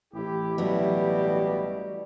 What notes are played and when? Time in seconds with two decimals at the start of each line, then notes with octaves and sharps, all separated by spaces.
0.13 A1 E4 G4
0.58 B2 F#3 G3 E4